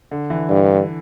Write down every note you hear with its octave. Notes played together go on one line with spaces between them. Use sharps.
D3
E3
G2